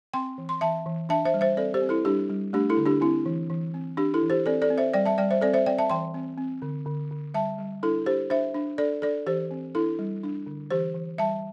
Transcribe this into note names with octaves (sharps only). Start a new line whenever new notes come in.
C4 G5 C6
E3
C6
E3 E5 A5
E3
D4 E5 A5
C5 E5
G3
C5 E5
C4 A4 D5
G4 C5
C4
E4 A4
G3 D4 G4
G3
A3 D4 G4
E4 A4
D3
D4 G4
C4 E4
E3
E3
C4
D4 G4
E4 A4
E3
G4 C5
C4 A4 D5
A4 D5
C4
C5 E5
G3 D5 G5
E5 A5
G3 D5 G5
C5 E5
C4 A4 D5
C5 E5
C4 D5 G5
E5 A5
E3 G5 C6
C4
C4
D3
D3
D3
G3 E5 A5
G3
D4 E4 A4
D4 G4 C5
D4 C5 E5
D4
D4 A4 D5
D4 A4 D5
E3 G4 C5
C4
D4 E4 A4
G3
D4
D3
E3 G4 C5
E3
G3 E5 A5